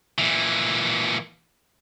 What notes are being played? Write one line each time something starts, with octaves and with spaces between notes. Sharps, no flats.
A#2 E3